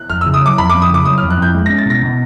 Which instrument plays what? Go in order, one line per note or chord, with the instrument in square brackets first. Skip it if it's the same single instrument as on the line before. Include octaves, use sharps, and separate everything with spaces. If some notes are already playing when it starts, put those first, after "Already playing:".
Already playing: [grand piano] F#6
[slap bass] F2 [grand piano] F6
[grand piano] E6
[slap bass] C#3
[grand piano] D#6
[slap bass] F#3 [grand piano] D6
[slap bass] F2 [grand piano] B5
[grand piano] D6
[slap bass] F2
[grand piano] D#6
[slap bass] C#3 [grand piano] D6
[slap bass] F#3 [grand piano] D#6
[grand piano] F6
[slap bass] F2
[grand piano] F#6
[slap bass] F2 [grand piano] G6
[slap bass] G#3
[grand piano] A#6
[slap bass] C#4
[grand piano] A6
[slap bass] B2 [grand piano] A#6
[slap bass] B2